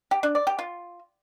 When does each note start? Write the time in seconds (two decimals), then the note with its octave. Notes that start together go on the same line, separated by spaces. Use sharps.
0.11 G4
0.23 D4
0.35 D5
0.47 G4
0.59 F4